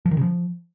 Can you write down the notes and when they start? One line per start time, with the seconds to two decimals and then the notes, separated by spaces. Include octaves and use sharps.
0.06 F3
0.11 D#3
0.17 C#3
0.23 F3